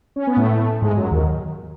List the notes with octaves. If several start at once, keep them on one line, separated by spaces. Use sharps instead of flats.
C#4
B3
A2 A3
G#2 G#3
F#2 F#3
D#2 D#3